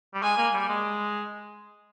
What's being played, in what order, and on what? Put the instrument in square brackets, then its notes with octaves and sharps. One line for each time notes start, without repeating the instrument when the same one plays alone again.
[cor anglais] G3
[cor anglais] G#3 [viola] G#5
[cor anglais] A#3
G3
G#3